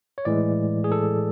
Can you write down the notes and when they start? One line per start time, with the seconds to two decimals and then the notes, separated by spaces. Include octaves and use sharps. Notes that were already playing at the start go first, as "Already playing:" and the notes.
0.18 C#5
0.25 A2 E3 G#3 D5
0.84 G#4
0.92 A4